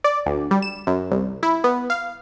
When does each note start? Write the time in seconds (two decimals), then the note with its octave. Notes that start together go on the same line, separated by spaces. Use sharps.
0.04 D5
0.26 D2
0.51 G3
0.62 E7
0.87 F#2
1.11 C2
1.43 E4
1.64 B3
1.90 F5